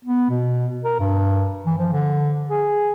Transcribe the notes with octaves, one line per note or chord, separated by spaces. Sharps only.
B3
B2
A#4
G2
E3
F3
D3
G#4